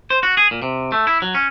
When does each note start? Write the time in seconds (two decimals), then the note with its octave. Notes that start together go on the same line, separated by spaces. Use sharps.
0.10 C5
0.23 F#4
0.37 G#4
0.51 A#2
0.62 C3
0.92 A3
1.07 E4
1.22 F#3
1.35 C#4